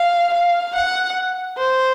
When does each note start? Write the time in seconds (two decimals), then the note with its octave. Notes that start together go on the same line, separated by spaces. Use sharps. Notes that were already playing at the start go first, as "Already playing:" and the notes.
Already playing: F5
0.34 F5
0.76 F#5
1.57 C5